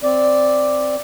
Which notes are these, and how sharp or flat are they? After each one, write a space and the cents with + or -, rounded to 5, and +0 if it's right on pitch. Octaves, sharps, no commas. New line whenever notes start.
C4 +0 D5 +0